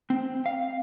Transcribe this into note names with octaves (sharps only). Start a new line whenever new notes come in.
C4
F5